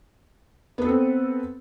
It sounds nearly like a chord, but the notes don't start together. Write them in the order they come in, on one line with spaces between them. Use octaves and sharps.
B3 B4 A4 C4